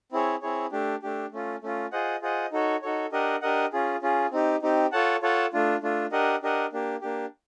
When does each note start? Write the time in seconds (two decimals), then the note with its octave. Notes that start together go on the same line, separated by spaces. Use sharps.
0.12 C4 E4 G#4 C#5
0.42 C4 E4 G#4 C#5
0.72 A3 D4 G4
1.02 A3 D4 G4
1.32 A3 C#4 F4
1.62 A3 C#4 F4
1.92 F4 G#4 C5 D#5 F#5
2.22 F4 G#4 C5 D#5 F#5
2.52 D#4 F#4 A4 C#5
2.82 D#4 F#4 A4 C#5
3.12 D4 G4 A#4 D#5 F#5
3.41 D4 G4 A#4 D#5 F#5
3.73 C#4 F4 G#4
4.02 C#4 F4 G#4
4.32 C4 D#4 G4
4.62 C4 D#4 G4
4.92 F4 A4 C#5 F#5 A5
5.22 F4 A4 C#5 F#5 A5
5.53 A3 D4 F4
5.82 A3 D4 F4
6.12 D4 G4 A#4 D#5 F#5
6.43 D4 G4 A#4 D#5 F#5
6.73 A#3 D4 G4
7.01 A#3 D4 G4